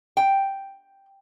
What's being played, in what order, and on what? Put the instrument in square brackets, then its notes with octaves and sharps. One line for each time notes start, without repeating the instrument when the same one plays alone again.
[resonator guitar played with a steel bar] G5